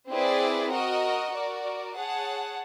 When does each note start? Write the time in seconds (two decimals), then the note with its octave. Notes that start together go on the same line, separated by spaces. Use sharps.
0.11 C4 E4 G#4 B4 D5
0.72 F#4 A#4 D#5 F#5
1.33 F#4 A#4 D5
1.94 G#4 C#5 F#5 A5